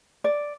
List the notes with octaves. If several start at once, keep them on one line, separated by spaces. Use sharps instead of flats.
D5